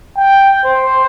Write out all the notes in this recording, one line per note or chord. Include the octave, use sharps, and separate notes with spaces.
G5
C5